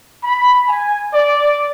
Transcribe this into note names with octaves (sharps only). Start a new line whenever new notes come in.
B5
G#5
D5